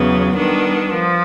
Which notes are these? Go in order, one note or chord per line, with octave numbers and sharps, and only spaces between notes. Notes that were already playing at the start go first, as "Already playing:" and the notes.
Already playing: E2 C#3 F#3 B3
D#3 G3 B3 D4
F3